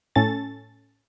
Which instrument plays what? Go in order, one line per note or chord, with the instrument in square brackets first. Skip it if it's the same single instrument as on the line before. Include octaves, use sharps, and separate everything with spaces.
[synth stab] A2 C#4 A4 A6